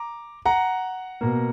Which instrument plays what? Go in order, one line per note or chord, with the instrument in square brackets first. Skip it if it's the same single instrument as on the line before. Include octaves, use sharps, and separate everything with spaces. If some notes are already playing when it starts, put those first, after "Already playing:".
Already playing: [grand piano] A#5 D6
F#5 A#5
B2 A#3